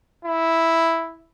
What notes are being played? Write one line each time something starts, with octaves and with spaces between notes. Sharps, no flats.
E4